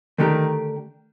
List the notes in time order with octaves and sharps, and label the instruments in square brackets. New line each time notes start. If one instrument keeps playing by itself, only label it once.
[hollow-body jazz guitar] D3 A3 D4 G4 A#4 [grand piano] D#3